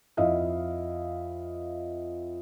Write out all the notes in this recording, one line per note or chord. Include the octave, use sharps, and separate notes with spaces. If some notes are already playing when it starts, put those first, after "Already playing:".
F2 E4 D#5 F5